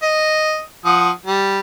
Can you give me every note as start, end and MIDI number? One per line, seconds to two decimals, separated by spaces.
0.02 0.61 75
0.85 1.10 53
0.85 1.10 78
0.85 1.10 87
1.26 1.60 55